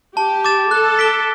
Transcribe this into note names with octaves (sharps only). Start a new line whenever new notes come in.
G4 A5
D6 A6 E7
A4 F#6
B6 D7 G7